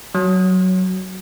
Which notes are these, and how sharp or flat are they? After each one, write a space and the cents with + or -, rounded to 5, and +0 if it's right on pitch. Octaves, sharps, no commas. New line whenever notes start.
F#3 +5